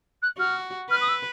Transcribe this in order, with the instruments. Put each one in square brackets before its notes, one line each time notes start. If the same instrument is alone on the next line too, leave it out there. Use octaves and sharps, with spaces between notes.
[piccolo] F#6
[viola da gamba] F#4 [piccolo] F6
[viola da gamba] B4 [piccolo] F6
[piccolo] D#6
E6